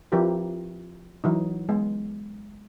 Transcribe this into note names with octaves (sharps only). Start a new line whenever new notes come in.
F3 C4 E4 G4 A#4 B4
E3 F#3 D#4
G#3 B3